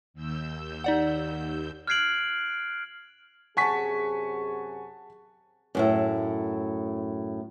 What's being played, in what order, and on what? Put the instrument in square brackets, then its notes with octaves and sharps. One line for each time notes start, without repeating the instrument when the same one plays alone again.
[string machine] D#2 E6 G6
[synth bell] D#4 D5 F#5
[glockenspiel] F6 F#6 G#6 C7 D7 F#7
[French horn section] F#2 C3 G#4 [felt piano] F#5 A5 [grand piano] G#5 C#6 B6
[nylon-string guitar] F#2 A2 E5